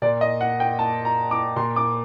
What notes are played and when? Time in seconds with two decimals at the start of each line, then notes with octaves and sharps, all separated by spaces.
0.02 A#2 D5
0.21 D#5
0.41 F#5
0.60 G5
0.79 A5
1.05 A#5
1.31 D6
1.56 A#2 C6
1.76 D6